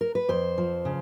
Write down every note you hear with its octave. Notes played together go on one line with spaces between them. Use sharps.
A#4
B4
F2 C5
F3
C#3